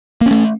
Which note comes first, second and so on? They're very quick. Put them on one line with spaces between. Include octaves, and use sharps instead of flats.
A#3 C#4 A3